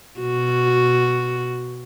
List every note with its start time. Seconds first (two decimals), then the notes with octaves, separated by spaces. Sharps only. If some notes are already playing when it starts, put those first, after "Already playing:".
0.20 B2 F#4